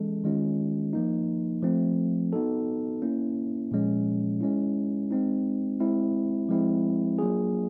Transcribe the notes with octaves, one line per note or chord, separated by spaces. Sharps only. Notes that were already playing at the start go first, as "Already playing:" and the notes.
Already playing: E3 G#3 C#4 A4
D#3 G#3 C#4 F4
F3 A#3 D#4
F3 A3 C4
B3 D#4 F#4 A4
A#3 C#4 E4
A#2 F3 G#3 C#4
G#3 C#4 E4
G#3 C4 D#4
G#3 C4 E4
F3 G#3 C4 E4
F#3 A#3 D4 F4 G#4